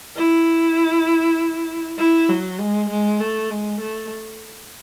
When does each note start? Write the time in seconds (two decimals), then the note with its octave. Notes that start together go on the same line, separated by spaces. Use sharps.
0.17 E4
1.99 E4
2.30 F#3
2.59 G#3
2.90 G#3
3.20 A3
3.50 G#3
3.81 A3